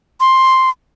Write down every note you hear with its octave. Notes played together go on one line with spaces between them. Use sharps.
C6